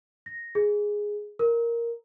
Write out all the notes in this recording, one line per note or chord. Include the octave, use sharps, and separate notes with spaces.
A#6
G#4
A#4